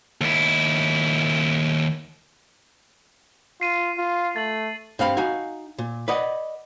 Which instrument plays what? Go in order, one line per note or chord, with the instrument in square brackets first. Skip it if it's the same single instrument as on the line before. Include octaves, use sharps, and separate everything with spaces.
[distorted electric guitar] D#2 E4
[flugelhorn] F4 [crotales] C7 D#7
[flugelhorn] F4
[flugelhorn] A3 [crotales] A6 F#7
[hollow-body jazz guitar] G2 C4 F5 B5
D#4 F#4 F5 G#5
A#2
B4 D5 D#5 F#5